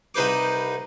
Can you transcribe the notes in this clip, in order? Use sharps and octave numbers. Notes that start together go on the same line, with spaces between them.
C2 D#4 B4 C5 D6